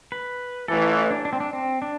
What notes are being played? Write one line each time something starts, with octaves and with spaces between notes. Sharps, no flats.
B4
A1 A2 E3 A4
F4
D4
D4
C4
D4
C4
D4